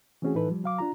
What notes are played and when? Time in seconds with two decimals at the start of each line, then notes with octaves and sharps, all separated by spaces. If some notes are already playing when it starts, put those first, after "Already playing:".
0.22 E3 A3 C4 C#4 F#4 G#4
0.35 A2 E3 D#4 A4 B4
0.48 F3 G3
0.64 F#3 F5 D6
0.79 D4 F4 A#5